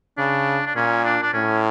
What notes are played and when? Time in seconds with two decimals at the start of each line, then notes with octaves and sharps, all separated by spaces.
0.18 C#3 D4
0.66 D4
0.76 A#2 C#4
1.05 D4
1.22 D4
1.34 A2 C#4